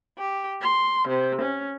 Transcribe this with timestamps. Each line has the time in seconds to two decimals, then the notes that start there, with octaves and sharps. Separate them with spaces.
0.17 G4
0.61 C6
1.08 C3
1.41 C#4